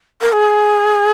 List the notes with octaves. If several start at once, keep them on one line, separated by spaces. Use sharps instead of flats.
A#4
G#4